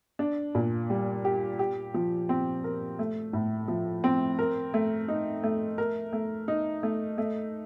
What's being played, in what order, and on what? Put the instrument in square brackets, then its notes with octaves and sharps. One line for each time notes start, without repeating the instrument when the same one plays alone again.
[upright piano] D4
A#2
G3
G4
G4
F3
C4
A#4
A3
A2
F3
C4
A#4
A3
D#4
A3
A#4
A3
D#4
A3
A3